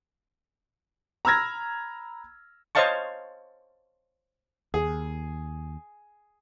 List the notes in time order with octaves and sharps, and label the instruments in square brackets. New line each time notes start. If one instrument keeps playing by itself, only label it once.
[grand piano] A#5 B5 E6 F6 G#6 A#6
[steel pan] C5 C#5 D#5 F5 A5 C#6
[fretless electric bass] D#2 [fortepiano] G#4